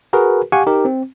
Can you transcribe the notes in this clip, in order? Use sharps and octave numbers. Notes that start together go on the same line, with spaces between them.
F#4 G#4 A#4 B4
G4 F5 F#5 G#5 C#6
D#4 G4 A#4
C4